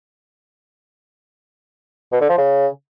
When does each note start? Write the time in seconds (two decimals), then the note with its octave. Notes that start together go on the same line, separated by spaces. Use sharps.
2.12 B2
2.21 D3
2.29 F3
2.38 C#3